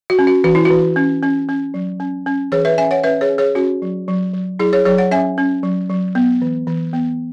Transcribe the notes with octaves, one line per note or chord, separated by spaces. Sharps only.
F#4
C#4
F#4
E3 F#4
E4
E3 F#4
C#4
C#4
C#4
F#3
C#4
C#4
E3 G#4 C#5
B4 E5
C#4 E5 G#5
C#5 F#5
C#4 B4 E5
G#4 C#5
C#4
G#4 C#5
C#4 F#4
F#3
F#3
F#3
F#3 E4 G#4
G#4 C#5
F#3 G#4 C#5
C#5 F#5
C#4 E5 G#5
C#4
F#3
F#3
B3
E3
E3
B3